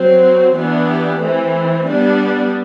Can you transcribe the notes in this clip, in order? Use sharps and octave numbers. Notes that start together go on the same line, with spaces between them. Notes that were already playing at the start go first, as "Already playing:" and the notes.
Already playing: F#3 C4
F#4
E3 B3 D4
G4
E3 A3 C4
G3 B3 D4